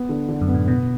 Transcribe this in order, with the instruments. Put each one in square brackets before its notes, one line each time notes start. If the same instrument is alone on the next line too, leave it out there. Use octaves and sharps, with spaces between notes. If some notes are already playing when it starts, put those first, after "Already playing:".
Already playing: [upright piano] B3
D3
D3
[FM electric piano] F#2
[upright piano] B3
[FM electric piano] A2
[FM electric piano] B2 [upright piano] B3